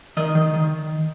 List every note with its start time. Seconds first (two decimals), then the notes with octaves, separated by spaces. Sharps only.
0.17 D#3 D#5
0.35 D#3
0.54 D#3